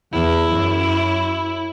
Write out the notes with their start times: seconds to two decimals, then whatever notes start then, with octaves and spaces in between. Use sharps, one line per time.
0.13 E2 E4
0.55 F#2